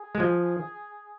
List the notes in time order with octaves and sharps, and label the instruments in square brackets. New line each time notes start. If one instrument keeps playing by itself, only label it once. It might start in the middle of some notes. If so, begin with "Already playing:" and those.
Already playing: [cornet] G#4
[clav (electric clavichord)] G#3
F3